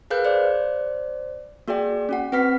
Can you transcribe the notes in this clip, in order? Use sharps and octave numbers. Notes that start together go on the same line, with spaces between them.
G#4 A#4 B4 F5 F#6 G6
C5 D5
A#3 F#4 G#4 D5 G5
C#4 F#4 F#5
C4 B4 F#5 F6 B6